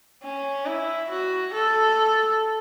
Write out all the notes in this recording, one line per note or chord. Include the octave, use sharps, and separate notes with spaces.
C#4
E4
F#4
A4